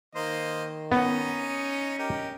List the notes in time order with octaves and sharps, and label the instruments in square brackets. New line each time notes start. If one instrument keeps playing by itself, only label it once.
[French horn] D#3 [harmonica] A#3 C5 D#5
[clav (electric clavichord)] B3 [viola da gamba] C#4 [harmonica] D#4 D#5
[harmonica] G4 A#4 [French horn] D#5